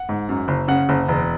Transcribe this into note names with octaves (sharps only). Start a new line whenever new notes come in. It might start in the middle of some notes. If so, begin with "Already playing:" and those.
Already playing: F#5
G#2
F#2
F#1
C#3 F#5
F#1
E1